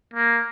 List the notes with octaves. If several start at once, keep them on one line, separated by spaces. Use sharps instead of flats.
A#3